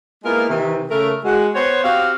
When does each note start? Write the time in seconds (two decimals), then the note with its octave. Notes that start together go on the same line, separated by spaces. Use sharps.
0.24 G#3 A#3 B3 E4 F4 A#4
0.49 C3 D#3 E3
0.90 C#3 A3 A#4
1.24 G#3 F#4
1.54 B3 C5 C#5
1.84 C4 F#4 G4 F5